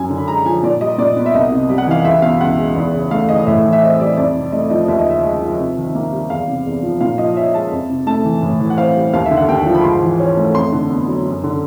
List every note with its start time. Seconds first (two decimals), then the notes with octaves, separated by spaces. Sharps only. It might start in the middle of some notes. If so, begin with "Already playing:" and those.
Already playing: F#2 F#3 G#5
0.10 D3
0.17 B5
0.28 G#3 A#5
0.46 F3 G#5
0.63 A#2 D5
0.81 G3 D#5
0.98 A#2 D5
1.16 B3
1.26 E5
1.34 C2 D#5
1.51 C3
1.69 G3
1.78 F#5
1.87 E3 F5
2.05 C#2 E5
2.22 B2 F5
2.40 C#2 F#5
2.58 G#3
2.75 E2
2.93 C#3
3.11 A3 F5
3.29 E3 D#5
3.46 A2 E5
3.64 E3
3.72 E5
3.82 C4 D#5
4.00 G3 D5
4.17 F2 D5
4.35 C3
4.52 A3 D#5
4.70 F3 D#5
4.88 D#2 E5
4.99 D#5
5.06 C#3 E5
5.23 G#3
5.41 F3
5.59 C3
5.77 D#3
5.95 A#3
6.12 G3
6.29 E2 F5
6.47 C3
6.66 E2
6.83 F3
7.01 A#2 F5
7.18 F3 D#5
7.36 C#4 E5
7.54 G#3 A5
7.72 F2
7.89 C3
8.07 A3 A5
8.25 E3
8.42 A2
8.60 E3
8.70 F#5
8.77 C4 F5
8.95 G3
9.13 D#2 F5
9.25 E5
9.31 D3
9.37 F#5
9.48 D#2 G5
9.66 F3
9.75 B5
9.84 G#2 C6
10.02 E3
10.19 C#4
10.37 A3
10.55 F2 C6
10.72 D3
10.90 B3
11.08 F#3
11.26 F#2
11.44 D3